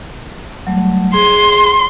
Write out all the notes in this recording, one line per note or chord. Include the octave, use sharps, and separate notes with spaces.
F#3 G3 A3
G#4 C6